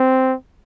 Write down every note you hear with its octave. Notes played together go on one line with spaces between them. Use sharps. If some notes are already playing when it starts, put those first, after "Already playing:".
Already playing: C4